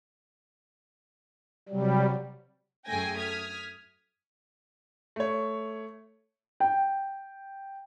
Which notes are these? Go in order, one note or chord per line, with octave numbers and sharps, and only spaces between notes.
C3 F#3 G3
F#2 A3 G#4 G5 G#5 A#6
D#6 F6 G#6 B6
A3 C#5
G5